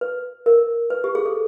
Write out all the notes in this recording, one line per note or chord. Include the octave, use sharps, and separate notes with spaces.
B4
A#4
B4
G4
G#4
A4